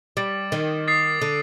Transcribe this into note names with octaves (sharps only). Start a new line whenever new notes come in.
G3 D6 A6 D7 F#7
D#3
D#6 A6 C7
D3